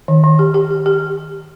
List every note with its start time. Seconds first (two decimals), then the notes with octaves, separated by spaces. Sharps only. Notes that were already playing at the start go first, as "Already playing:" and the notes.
0.08 D#3
0.24 D#3
0.39 G4
0.54 G4
0.71 G4
0.86 G4